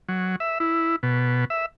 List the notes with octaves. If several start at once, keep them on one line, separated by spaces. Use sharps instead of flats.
F#3
E5
E4
B2
E5